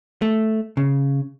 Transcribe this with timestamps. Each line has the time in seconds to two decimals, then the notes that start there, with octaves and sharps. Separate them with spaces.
0.22 A3
0.77 C#3